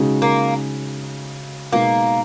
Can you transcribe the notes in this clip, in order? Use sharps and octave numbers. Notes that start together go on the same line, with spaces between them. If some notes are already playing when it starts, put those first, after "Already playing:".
Already playing: C#3 G#3 D#4 F#4
A#3
B2 G#3 A#3 D#4